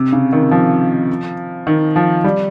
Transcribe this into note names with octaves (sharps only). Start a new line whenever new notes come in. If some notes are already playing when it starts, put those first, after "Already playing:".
Already playing: C3
C#3
D#3
F3
D#3
F3
G3